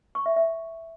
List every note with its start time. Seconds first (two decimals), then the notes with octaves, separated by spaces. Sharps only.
0.15 C#6
0.26 E5
0.36 E5